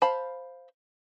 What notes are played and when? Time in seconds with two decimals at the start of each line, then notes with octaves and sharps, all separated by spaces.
0.02 C5 F5 A5 B5